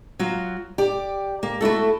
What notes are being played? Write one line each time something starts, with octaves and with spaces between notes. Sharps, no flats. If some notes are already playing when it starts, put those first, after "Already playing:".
F#3 F4 F#4
G4 D5
A#3
A3 E4 F#4 A4